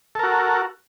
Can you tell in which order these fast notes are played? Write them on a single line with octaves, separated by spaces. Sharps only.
A4 A#4 F#4